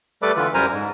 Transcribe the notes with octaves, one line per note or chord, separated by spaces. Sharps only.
G3 A3 A4 B4 D5 D6
D3 E3 F4 B4
F#2 G3 A#4 C5 G#5 A#5
G#2